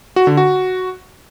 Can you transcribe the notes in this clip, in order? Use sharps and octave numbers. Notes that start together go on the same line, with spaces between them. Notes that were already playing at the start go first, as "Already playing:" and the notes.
F#4
D3
F#4